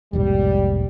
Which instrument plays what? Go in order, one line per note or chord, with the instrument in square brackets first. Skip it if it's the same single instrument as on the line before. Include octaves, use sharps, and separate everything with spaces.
[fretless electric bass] E1 A#1 G#2 [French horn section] G3